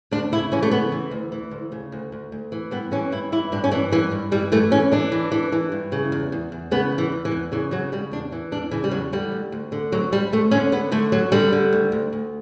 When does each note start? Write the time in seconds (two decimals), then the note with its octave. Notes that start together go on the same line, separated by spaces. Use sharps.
0.11 D2 D4
0.32 C#3 E4
0.52 E3 C#4
0.62 A3
0.71 C#3 B3
0.92 E3
1.11 D2
1.32 E3
1.51 D2
1.72 C#3
1.92 D2
2.12 D2
2.32 D2
2.52 E3
2.71 G2 B3
2.92 E3 C#4
3.11 G2 E4
3.32 E3 E4
3.52 G2 D4
3.64 C#4
3.71 E3 D4
3.91 G2 E3
4.11 G2
4.32 E3 G3
4.52 E3 A3
4.72 E3 C#4
4.92 E3 D4
5.12 E3
5.32 E3
5.52 E3
5.72 G2
5.92 C#3
6.12 E2
6.32 E2
6.52 E2
6.71 C#3 B3
6.92 E2
6.98 E3
7.12 E2
7.25 E3
7.31 E2
7.52 C#3 E3
7.71 C#3 F#3
7.92 C#3 G3
8.12 E2 D4
8.32 E3
8.52 E2 D4
8.71 C#3 E3
8.84 G3
8.91 E2 F#3
9.12 D3 G3
9.32 D2
9.52 D2
9.72 D3
9.92 D2 F#3
10.12 D2 G3
10.32 D2 A3
10.51 D3 C#4
10.72 D3 B3
10.91 D3 A3
11.12 D2 F#3
11.32 D3 G3
11.52 D3
11.73 D2
11.92 D2
12.13 D2